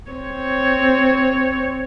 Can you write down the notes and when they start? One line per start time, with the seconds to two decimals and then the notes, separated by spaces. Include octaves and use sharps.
0.12 C4 C#5